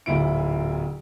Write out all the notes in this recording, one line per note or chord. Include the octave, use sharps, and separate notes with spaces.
D1 D2 A#2 E4 D7